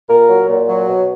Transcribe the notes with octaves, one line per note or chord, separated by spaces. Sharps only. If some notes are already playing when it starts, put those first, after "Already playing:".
A#2 A#4
F#3
A#2
F#3
B2